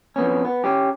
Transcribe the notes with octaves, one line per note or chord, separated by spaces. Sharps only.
F2 B3 C#4
B3
C#4 G4